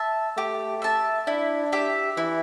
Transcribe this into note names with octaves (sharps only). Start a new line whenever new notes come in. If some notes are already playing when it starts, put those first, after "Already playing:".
Already playing: E5 A5
A3 G4
E5 A5
D4 E4
G4 E5
E3 E4